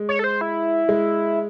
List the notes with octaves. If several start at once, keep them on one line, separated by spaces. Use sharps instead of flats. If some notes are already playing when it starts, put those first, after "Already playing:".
Already playing: G#3
C#5
A4
C5
E4
G#3